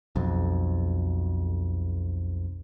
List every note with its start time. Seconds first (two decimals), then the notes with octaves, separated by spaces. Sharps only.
0.16 B1 F2